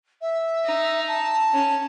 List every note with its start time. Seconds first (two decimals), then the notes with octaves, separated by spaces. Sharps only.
0.21 E5
0.65 D#4
1.07 A5
1.53 C#4